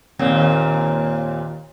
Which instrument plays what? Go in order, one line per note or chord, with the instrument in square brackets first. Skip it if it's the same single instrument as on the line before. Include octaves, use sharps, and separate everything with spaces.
[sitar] D#2 A#2 C4